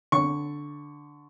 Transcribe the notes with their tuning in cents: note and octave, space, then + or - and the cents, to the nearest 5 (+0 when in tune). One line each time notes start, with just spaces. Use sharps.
D3 +0 C#6 +0